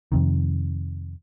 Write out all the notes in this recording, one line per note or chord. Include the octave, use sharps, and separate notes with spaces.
F2 C3 D#3